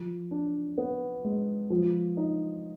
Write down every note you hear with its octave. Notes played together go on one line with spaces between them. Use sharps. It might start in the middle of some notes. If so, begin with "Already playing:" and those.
Already playing: F3
D4
B3
G#3
F3
D#4